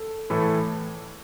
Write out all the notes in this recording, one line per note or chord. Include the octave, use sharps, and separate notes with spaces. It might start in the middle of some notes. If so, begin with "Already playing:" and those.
Already playing: A4
A2 E3 A3